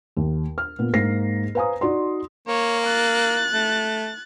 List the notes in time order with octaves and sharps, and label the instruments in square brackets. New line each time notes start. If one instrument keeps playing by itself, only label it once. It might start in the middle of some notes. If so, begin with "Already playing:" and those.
[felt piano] D#2
F6
A#2 B3
G#2 A#3 A#6 C7
B4 C5 F5 G#5 A#5 D#6
D#4 F#4 D5 C6
[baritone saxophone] A#3 [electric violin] C#5
[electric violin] F#6 A6
[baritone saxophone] A3